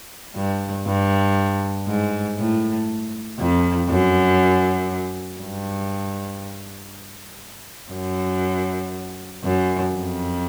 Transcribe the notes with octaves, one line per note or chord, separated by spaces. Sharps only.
G2
G2
G#2
A2
F2
F#2
G2
F#2
F#2
F2